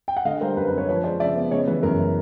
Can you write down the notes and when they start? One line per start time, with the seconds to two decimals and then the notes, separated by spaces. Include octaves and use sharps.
0.08 G5
0.17 F#5
0.25 D3 D#5 F5
0.41 G3 A#4 C5
0.57 F#2 B4
0.68 B4
0.73 C4
0.78 B4 C#5
0.89 F3 B4 C#5
1.04 G#3 C5 D5
1.20 C#3 D5 E5
1.36 B3
1.51 C#3 C#5 D#5
1.67 E3 B4
1.83 F#2 A#4